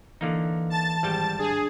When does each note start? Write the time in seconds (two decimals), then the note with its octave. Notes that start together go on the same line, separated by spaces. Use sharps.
0.21 D3 E3 A#3 D#4
0.70 A5 A6
1.03 G#1 G3 G5
1.39 D4 G#4